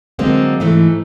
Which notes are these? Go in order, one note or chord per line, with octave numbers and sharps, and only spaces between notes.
D3 F#3 G#3 A#3 C4
G#2 E3 A3